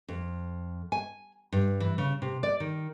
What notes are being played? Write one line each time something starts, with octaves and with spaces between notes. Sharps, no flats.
F2
G#5
G2
E3
C#3
C3
D5
D#3